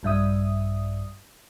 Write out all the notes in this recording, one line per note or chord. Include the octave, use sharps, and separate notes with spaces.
A#1 G2 E5 D#6